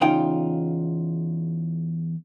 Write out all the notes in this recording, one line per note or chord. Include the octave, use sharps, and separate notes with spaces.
E2 C#3 D#4 F4 G5